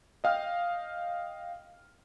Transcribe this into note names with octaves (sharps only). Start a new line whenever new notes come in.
D#5 F5 G5 F6